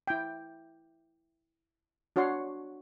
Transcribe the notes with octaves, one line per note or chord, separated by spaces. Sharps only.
E4 G5
D4 F#4 C#5 F#5 C6